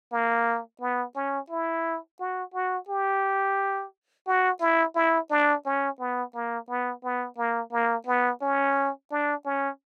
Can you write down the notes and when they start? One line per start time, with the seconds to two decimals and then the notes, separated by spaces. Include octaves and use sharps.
0.12 A#3
0.81 B3
1.15 C#4
1.50 E4
2.20 F#4
2.54 F#4
2.88 G4
4.27 F#4
4.61 E4
4.95 E4
5.30 D4
5.66 C#4
5.99 B3
6.34 A#3
6.69 B3
7.03 B3
7.38 A#3
7.72 A#3
8.07 B3
8.42 C#4
9.11 D4
9.45 C#4